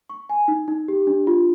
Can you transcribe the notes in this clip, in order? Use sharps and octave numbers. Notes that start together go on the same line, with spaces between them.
C#6
G#5
D#4
D#4
G4
D4
F4